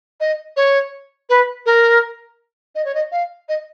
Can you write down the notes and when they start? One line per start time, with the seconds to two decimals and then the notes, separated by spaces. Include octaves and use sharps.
0.20 D#5
0.56 C#5
1.29 B4
1.66 A#4
2.75 D#5
2.85 C#5
2.95 D#5
3.11 F5
3.49 D#5